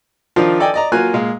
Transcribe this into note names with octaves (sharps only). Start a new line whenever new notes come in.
D#3 F3 D4 F4
A4 D5 D#5 G5 G#5
D5 D#5 A#5
F#3 A#3 F4 G#5 F6 F#6
A#2 G#3 F5